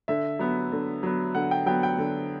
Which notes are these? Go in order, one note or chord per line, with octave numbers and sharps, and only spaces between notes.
D3 E5
F#3 B3
D3
F#3 B3
D3 F#5
G5
F#3 B3 G5
G5
D3